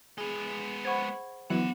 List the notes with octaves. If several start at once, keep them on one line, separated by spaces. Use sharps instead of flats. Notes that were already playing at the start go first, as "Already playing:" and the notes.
G#3 B3 G#4
C5 F#5 B5 C#6 G#6
E3 F#3 B3 G4 F#5